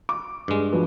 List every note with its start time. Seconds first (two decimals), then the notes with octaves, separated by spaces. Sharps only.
0.09 D6
0.48 G2 G#3
0.73 F3 F#4 B4